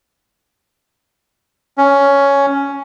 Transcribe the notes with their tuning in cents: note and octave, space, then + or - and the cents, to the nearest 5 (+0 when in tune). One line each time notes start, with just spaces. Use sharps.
C#4 +10